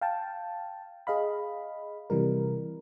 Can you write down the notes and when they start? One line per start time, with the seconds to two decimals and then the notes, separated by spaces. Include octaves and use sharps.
0.01 F5 G5 A5
1.07 G#4 D#5 F5 B5
2.10 C3 E3 G3 A#4